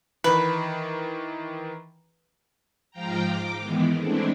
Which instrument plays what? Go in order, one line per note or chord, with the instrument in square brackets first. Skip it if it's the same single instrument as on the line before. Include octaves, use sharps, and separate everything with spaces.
[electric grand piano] D#3 E3 [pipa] B4
[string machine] G#2 F3 F5 G5 A#5
D6
D#3 E3 G#3 B3
G#3 A3 C4 D4 E4